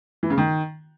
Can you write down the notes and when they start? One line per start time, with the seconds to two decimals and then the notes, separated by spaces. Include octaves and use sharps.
0.23 E3
0.30 C#3
0.38 D#3